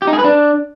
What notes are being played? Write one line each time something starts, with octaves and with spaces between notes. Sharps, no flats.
G4
D#4
G#4
B4
D4